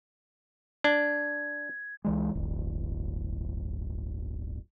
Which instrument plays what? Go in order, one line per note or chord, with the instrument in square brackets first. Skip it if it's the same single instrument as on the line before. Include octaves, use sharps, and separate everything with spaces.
[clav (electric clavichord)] D4 [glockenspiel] G#6
[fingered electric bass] C#2 E3 G#3
D1 G1